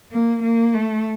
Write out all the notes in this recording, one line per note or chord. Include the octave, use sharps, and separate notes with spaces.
A#3
A#3
A3